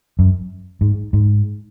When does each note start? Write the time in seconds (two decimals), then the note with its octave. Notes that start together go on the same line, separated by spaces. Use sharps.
0.19 F#2
0.81 G#2
1.13 G#2